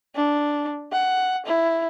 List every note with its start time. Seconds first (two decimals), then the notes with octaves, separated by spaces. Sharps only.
0.16 D4
0.92 F#5
1.46 E4